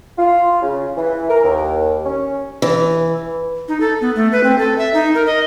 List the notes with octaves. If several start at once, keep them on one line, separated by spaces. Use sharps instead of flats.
F4
C#3
E3
A#4
D#2
C#4
E3
D#4
A4
B3
A3
B4
C4
A4
E5
D#4
A#4
D#5